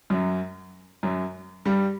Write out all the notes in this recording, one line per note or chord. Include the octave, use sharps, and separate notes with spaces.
F#2 F#3
F#2 F#3
G2 G3